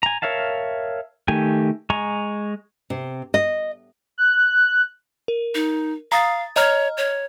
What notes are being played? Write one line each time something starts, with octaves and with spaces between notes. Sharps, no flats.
G#5 A#5
A#4 C#5 E5 F5 A5
D#3 A3 G4 G#5
G#3 G#5 A#5 C#6
C3
D#5
F#6
A#4
D#4
F5 A#5 D#6 A6
C#5 D#5 A#5 F6
C#5